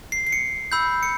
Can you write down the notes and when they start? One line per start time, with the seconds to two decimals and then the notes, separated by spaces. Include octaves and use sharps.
0.12 C7
0.27 C7
0.33 C#7
0.72 B5 E6 G6
1.03 C#7